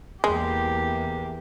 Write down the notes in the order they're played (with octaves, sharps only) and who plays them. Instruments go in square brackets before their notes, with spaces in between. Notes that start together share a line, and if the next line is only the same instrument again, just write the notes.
[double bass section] E2 [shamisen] G#3 [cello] A#3 G4